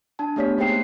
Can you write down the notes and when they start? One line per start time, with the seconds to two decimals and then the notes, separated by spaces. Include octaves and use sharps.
0.19 D4 A5
0.36 A3 B3 G4 C#5 D5 B6
0.58 A#3 D#4 G#4 C5 G5 C7